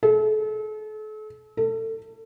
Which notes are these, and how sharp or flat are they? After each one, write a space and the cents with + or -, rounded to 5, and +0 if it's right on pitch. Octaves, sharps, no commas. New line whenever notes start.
A4 -40
A4 +25